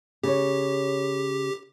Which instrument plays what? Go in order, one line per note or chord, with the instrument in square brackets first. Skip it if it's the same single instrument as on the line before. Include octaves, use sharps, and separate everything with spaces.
[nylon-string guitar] C#3 C#5 [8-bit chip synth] G4